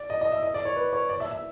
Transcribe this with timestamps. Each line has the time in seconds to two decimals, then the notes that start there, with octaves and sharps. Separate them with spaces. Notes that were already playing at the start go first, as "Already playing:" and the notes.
Already playing: D5
0.10 D#5
0.21 D#5
0.32 E5
0.43 D#5
0.54 D5
0.65 C#5
0.76 B4
0.93 C#5
1.09 D5
1.20 E5
1.31 E5